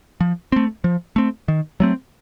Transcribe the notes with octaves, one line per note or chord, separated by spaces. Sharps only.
F3
A3 C4
F3
A3 C4
D#3
F#3 A3 C4